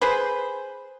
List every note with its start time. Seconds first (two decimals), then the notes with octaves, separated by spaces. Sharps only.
0.01 G#4 B4 C5